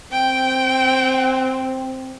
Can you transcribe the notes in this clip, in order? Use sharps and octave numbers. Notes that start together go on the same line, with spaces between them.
C4 G5